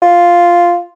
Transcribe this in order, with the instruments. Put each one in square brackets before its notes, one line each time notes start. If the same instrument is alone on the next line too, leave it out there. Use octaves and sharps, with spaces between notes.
[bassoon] F4